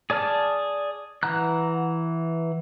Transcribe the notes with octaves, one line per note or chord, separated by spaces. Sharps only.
G#4 D5 A5 F6
E3 F#5 A#5 F#6